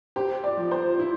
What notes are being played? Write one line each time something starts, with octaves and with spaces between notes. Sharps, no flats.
G4 C5
D5
F3
C5
E4